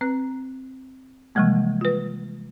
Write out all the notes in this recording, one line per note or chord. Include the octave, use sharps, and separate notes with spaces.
C4 B4 F#6
C3 E3 F3 G3 G#3 A#3
F4 B4